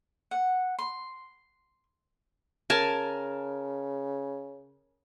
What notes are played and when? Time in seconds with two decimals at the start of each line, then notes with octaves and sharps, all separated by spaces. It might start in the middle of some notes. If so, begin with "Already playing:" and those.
0.31 F#5
0.79 C6
2.70 C#3 A#4 G#5 A5